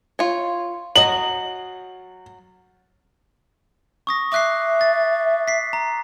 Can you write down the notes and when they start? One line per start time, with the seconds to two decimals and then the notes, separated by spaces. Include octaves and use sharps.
0.19 F4 C#5
0.96 F#3 D#5 F#7
4.07 C#6 D#6 A#6
4.32 E5 D6 F#6 C7
4.81 A6
5.48 B6 C7
5.73 A#5